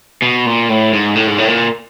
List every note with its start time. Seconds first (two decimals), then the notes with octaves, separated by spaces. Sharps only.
0.22 B2
0.46 A#2
0.69 A2
0.93 G#2
1.16 A2
1.27 G#2
1.38 A2
1.48 A#2